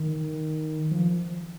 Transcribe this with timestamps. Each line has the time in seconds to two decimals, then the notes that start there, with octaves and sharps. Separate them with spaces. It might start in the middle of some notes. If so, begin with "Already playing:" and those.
Already playing: D#3
0.91 F3